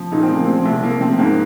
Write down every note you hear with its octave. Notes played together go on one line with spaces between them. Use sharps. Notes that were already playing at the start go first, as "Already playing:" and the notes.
Already playing: F3
A#2 D#4
C4
F3
A#3
F3 C4
C2
C2 A#3
F3 C4
G#2 A#3